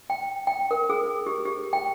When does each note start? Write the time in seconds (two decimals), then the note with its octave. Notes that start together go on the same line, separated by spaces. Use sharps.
0.10 G5
0.47 G5
0.71 A#4
0.90 G#4
1.27 G4
1.45 G4
1.73 G5